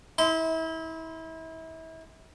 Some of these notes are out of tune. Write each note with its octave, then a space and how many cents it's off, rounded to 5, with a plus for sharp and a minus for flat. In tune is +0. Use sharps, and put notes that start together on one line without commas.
E4 -35 C6 -30